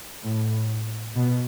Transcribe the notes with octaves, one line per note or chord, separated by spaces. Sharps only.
A2
B2